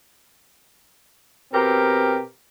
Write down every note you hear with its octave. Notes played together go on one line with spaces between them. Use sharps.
B2 C4 G4 A#4